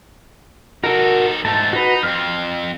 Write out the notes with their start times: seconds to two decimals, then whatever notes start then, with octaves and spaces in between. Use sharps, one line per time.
0.84 D#4 F#4 A4 A#4
1.45 G#2 A3 A5
1.73 D#4 F#4 B4
2.03 F2 C4 F6